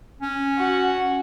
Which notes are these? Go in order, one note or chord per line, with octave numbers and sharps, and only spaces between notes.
C#4
F#4